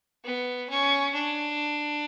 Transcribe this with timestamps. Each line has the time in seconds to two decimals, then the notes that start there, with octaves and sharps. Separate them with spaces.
0.24 B3
0.70 C#4
1.14 D4